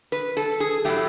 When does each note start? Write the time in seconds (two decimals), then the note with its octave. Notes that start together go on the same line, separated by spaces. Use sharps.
0.12 B4
0.37 A4
0.60 G#4
0.85 A2 F#3 A3 G4